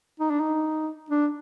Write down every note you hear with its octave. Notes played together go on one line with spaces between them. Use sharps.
D#4
D4
D#4
D4